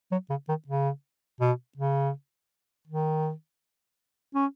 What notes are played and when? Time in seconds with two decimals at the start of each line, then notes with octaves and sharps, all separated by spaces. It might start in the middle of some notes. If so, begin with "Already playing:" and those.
0.12 F#3
0.30 C#3
0.49 D#3
0.68 C#3
1.41 B2
1.77 C#3
2.88 D#3
4.35 C#4